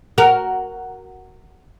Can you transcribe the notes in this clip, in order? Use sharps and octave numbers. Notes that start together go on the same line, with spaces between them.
F#4 A#4